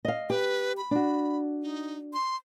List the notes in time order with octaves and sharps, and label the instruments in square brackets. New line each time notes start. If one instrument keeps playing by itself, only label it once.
[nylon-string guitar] D#5 F5
[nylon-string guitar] G4 [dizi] B4
[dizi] B5
[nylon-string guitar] D4 F#4
[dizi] D#4
C6